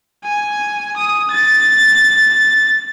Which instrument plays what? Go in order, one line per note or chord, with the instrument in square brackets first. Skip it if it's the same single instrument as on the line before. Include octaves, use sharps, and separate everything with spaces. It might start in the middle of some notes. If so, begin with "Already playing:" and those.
[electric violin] G#5
D#6
A6